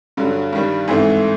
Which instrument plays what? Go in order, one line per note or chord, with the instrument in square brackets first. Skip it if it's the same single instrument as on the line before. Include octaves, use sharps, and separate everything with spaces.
[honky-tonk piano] G2 D3 F#3
G2 D#3 G3
G#2 E3 A3 C4